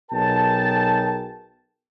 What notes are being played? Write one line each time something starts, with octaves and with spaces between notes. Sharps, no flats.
B1 B2 G#4 A#4 G5 A5